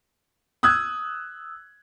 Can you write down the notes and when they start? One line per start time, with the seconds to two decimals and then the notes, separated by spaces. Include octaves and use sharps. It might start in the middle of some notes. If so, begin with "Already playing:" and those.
0.63 D#6 E6 F#6 G#6